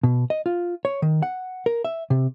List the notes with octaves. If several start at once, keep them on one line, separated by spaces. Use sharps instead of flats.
B2
D#5
F4
C#5
D#3
F#5
A#4
E5
C3